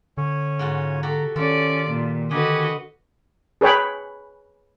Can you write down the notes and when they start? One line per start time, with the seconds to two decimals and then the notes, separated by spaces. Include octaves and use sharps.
0.17 D3 C#4 C#5
0.59 G#2 F4 F#4
1.03 F#4 G4 A4 A#5
1.36 D#3 C#4 F4 A4 D5
1.88 A#2
2.31 D3 F#4 G4 B4 D#5 G#5
3.61 G#4 B4 C#5 G5 B5